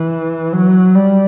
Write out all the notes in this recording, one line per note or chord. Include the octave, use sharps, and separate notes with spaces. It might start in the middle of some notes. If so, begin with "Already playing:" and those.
Already playing: E3
F#3
G3